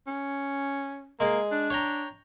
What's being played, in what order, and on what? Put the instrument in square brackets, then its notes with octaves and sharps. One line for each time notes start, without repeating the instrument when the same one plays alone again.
[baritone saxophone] C#4
[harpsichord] G#3 G#4 [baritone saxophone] A#3
[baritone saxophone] D4
[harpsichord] C#5 G5 A#5